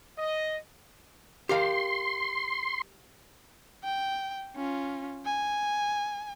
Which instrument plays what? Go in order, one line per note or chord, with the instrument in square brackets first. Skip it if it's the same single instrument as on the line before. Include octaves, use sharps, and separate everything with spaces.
[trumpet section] D#5
[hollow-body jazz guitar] G4 A#4 F5 [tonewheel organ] C6
[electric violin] G5
C#4 F4
G#5